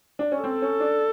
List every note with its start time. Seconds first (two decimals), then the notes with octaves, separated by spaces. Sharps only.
0.19 D4
0.32 C#4
0.43 C4 A4
0.62 C#4
0.80 D4